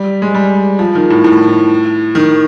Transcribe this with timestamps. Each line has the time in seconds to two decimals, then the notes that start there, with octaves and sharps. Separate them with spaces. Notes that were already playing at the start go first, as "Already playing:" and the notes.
Already playing: G3
0.22 G#3
0.34 G3
0.79 F3
0.95 D#3
1.10 A2
1.24 A2
2.15 D#3